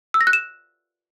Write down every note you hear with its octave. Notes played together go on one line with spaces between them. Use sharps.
E6
A#6
F#6
E7